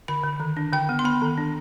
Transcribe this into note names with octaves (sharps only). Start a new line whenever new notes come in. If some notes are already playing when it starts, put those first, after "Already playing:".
D3 B5
D3
D#3
D4
D3 G5
B3
C6
B3 B5
D#3
D4